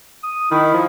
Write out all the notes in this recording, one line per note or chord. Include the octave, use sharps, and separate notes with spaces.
D#6
D#3 E4
F3